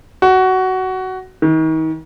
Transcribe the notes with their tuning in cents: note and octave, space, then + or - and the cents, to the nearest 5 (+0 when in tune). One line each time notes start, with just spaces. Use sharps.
F#4 +15
D#3 +40